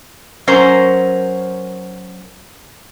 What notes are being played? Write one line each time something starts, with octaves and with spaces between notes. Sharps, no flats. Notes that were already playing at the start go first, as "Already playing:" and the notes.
F#3 C#4 A#4 C5